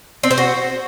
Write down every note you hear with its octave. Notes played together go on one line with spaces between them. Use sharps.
C4
C5
F#4